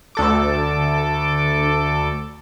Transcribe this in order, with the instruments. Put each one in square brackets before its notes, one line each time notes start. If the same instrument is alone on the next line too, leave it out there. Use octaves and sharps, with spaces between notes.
[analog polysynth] D2 A4 D6